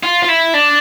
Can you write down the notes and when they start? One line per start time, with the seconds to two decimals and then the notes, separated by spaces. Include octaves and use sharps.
0.03 F4
0.23 F4
0.28 E4
0.54 D4